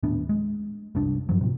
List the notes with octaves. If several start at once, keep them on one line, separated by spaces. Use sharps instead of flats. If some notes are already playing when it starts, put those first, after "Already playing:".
D#1 A2 B3 D4
G#3
F1 C2 G2 D4
G2 F3 F#3
A2 C3